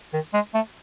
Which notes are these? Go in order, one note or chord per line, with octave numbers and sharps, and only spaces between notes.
D#3
G#3
A3